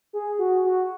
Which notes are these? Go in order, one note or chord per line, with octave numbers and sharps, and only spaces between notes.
G#4
F#4
F#4